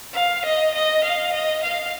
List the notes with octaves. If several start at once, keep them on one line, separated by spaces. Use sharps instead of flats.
F5
D#5
D#5
F5
D#5
F5